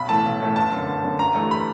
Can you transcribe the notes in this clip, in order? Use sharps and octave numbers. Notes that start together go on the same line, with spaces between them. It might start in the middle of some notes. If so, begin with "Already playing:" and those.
Already playing: B1 B5
A2 E3 A3 A5
B1
A2 E3 A3
G1 A5
F#2 D3
G1
F#2 D3
G1 A#5
G2 E3 A3
B5